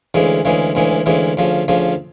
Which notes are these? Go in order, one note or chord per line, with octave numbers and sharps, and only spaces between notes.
D2 C#3 E3 G#3
D2 C#3 E3 G#3
D2 C#3 E3 G#3
D2 C#3 E3 G#3
D2 C#3 F3
D2 C#3 F3